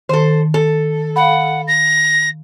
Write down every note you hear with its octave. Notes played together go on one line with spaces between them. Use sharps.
D#3 A4 C5
A4
F5 F#5 B5
A#6